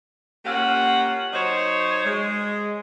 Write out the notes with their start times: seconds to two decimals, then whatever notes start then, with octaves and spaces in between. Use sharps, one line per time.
0.45 A#3 C#4 F4 G4 F#5
1.33 F#3 D#4 C5 C#5
2.05 G#3